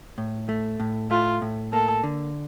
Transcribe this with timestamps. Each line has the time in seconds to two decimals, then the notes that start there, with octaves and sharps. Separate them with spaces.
0.18 A2
0.49 A3
0.80 A2
1.11 A3 F4
1.42 A2
1.73 A#3 A4
2.04 D3